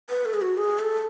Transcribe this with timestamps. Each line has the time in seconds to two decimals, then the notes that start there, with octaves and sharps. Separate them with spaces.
0.09 B4
0.25 A4
0.34 G#4
0.41 F#4
0.58 G#4
0.79 A4